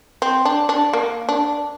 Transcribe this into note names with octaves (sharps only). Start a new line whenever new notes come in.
C4
D4
D4
A#3
D4